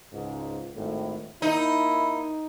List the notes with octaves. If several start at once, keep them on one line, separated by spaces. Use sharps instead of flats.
C#2 G#2
G#1 A2
A#3 D#4 E4